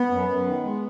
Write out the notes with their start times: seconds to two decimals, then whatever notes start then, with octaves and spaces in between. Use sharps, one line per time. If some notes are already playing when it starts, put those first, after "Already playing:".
Already playing: B3
0.11 F#2
0.29 F#2
0.46 D#3
0.64 G#3